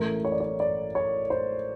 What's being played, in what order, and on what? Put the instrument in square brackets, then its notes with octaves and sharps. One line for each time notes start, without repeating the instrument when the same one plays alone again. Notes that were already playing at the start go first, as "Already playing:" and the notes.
Already playing: [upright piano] A1 A2 E3 A3 A#4
C#5
D5
C#5
D5
C#5
C5